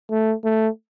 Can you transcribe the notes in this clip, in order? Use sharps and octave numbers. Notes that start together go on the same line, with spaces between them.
A3
A3